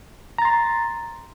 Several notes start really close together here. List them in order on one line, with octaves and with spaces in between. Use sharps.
A#5 A6 C6